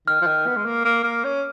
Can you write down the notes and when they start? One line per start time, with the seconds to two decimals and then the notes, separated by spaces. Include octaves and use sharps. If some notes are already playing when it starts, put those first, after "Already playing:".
0.07 D#3 F6
0.21 F3
0.26 D#3
0.46 B3
0.56 G#3
0.65 A#3
0.85 A#3
1.04 A#3
1.24 C#4